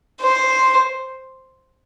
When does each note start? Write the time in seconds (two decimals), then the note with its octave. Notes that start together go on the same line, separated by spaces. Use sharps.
0.21 C5